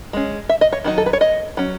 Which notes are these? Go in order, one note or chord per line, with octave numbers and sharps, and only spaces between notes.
G#3 C#4
E5
D#5
C#5
D#3 F#3 D#4
A4
B4
C#5
D#5
F#3 C#4